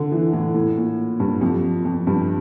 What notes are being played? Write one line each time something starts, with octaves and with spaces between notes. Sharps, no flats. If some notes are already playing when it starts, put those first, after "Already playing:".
Already playing: D3
E3
A2
A2
A#2
G2
F2
F2
G2